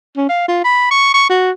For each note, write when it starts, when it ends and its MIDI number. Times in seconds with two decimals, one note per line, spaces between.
0.17 0.27 61
0.29 0.47 77
0.48 0.64 65
0.64 0.89 83
0.91 1.11 85
1.14 1.26 85
1.30 1.51 66